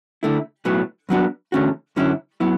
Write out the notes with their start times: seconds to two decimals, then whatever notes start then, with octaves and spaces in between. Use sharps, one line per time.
0.23 D3 A3 E4
0.65 B1 A2 F#3 B3
1.09 G2 F#3 B3 D4 F#4
1.52 E2 D3 A3 C#4 F#4
1.96 F#2 D3 F#3 C#4 E4
2.40 F#3 B3 E4